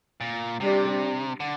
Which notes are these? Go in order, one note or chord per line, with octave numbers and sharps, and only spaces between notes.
A#2
C3 G3 D4 G4 D5
D3